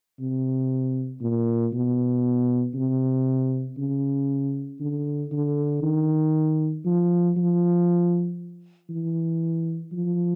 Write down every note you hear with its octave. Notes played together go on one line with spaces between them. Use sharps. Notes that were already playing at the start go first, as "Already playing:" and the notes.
C3
A#2
B2
C3
C#3
D3
D3
D#3
F3
F3
E3
F3